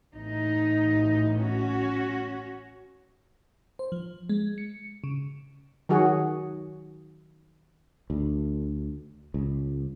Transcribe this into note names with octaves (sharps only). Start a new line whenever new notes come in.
A1 D#4
C#4 F#4
C5
F3
G#3
C#7
C#3
D#3 F#3 F#4 G#4
D2
C#2